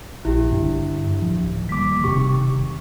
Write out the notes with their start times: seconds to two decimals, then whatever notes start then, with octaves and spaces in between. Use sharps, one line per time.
0.25 A#1 E4 G4
0.51 G2 D3 D4
1.22 D1 F3
1.69 D#3 G3 A#3 D6 B6
2.04 E1 C3 D#3 G4 C#6